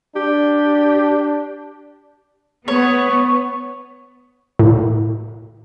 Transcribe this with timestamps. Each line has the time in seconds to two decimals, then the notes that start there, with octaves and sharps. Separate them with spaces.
0.16 D4 G4
2.68 B3 C#5
4.59 A2